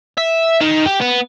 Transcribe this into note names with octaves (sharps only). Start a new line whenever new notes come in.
E5
D#3
G4
B3